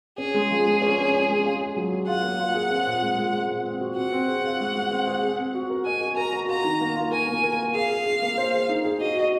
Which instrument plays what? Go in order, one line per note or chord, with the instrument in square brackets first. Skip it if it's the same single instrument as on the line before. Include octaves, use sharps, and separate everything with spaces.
[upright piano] C#4 [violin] G#4
[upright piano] G#3
F3
G#3
C#4
C#4
C#4
G#3
F4
G#4
F#3
G#4
[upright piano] F4 [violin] F#5
[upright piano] A#3
F4
G#4
C4
A#2
G#3
G#3
C4
A#2
C4
F#4
[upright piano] C4 [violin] F#5
[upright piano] C4
G#4
F4
G#3
G#3
C4
G#4
C4
C4
F#4
A#4
[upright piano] D#5 [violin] G#5
[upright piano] F#4
[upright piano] A#4 [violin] A#5
[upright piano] F#4
[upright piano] F4 [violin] A#5
[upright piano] D#3
A#3
F4
[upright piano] A#4 [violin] G#5
[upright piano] A#3
A#4
F4
[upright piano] G#4 [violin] F5
[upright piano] G#4
G#4
A#3
C5
G#4
D#4
G#4
[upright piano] F#4 [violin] D#5
[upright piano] F#4